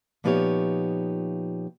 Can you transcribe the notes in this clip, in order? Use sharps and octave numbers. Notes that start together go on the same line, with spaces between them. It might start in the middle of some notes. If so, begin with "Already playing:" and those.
A#2 F3 B3 D#4 G4 C#5